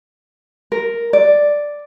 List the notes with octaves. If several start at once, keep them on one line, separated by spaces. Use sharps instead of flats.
A#4
D5